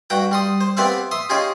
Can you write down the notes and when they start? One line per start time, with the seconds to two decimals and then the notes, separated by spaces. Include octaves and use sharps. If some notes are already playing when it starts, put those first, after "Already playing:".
0.10 G2 F#4 G5 A#5
0.31 G3 C6 D#6
0.61 C5
0.77 B3 C4 G4 D5 E5 F5
1.11 E5 C6 D#6
1.30 C#4 D#4 F4 G4 G#4